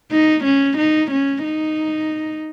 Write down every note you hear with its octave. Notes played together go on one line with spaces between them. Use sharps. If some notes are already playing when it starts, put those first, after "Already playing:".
D#4
C#4
D#4
C#4
D#4